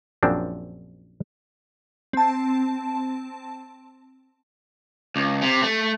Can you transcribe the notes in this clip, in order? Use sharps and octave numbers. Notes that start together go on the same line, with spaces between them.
A#1 F#2 F3 C4 D4
C4 A5
C#2
C3
A3